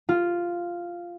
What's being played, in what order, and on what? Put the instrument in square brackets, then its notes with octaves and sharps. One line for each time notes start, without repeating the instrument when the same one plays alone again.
[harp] F4